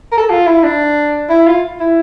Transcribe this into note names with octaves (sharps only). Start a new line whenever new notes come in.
A#4
A4
F4
E4
D4
E4
F4
E4